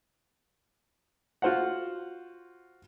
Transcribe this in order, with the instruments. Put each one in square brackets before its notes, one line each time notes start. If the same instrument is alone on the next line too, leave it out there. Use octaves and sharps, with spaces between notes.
[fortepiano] F4 F#4 C5 F5 F#5